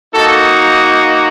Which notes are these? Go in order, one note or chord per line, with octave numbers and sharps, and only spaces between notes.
A#3 D#4 F#4 A4